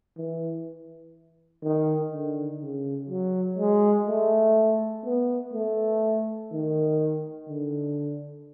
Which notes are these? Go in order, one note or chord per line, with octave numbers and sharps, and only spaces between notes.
E3
D#3
D3
C#3
F#3
G#3
A3
B3
A3
D#3
D3